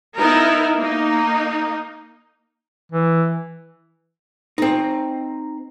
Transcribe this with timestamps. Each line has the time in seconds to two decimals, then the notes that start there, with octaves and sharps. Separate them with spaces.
0.17 B3 D#4 E4 A#4
0.77 A#3 D#4
2.92 E3
4.58 C4 D#4